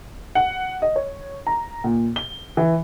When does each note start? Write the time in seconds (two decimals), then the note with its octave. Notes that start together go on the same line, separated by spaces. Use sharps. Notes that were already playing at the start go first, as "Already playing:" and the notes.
0.35 F#5
0.82 D#5
0.96 C#5
1.47 A#5
1.84 A#2
2.16 G7
2.57 E3